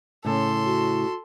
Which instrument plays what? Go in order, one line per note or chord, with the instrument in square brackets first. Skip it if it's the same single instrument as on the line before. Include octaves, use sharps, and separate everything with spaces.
[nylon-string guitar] A2 C#3 E4 [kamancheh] A4 C6
[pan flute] F#4